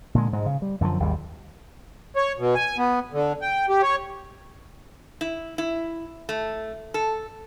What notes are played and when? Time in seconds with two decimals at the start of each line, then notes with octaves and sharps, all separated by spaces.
0.15 A#2 D3 G#3
0.33 G#2 G#3
0.46 C#3
0.62 G3
0.81 F#2 D3 E3 F3
1.00 G#1 D#2 G3
2.16 C#5
2.38 B2
2.55 G#5
2.78 B3
3.13 D3
3.42 G5
3.69 G4
3.82 C#5
5.21 E4
5.58 E4
6.29 A3
6.94 A4